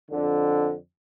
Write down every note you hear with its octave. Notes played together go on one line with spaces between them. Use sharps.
F2 D3